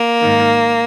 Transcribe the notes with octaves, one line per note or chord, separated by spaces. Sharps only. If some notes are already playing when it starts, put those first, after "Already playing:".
Already playing: A#3
G#2 D#3